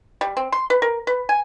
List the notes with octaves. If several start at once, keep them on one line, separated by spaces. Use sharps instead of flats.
G3
C4
C6
B4
A#4
B4
G#5